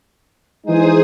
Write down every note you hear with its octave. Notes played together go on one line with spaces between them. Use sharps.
E3 G#3 D#4 G#4 C5 D#6